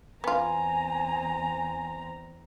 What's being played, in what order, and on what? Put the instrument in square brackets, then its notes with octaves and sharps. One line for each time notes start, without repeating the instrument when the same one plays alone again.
[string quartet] E2 C4 A#5 [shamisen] B3 F4 [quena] G#5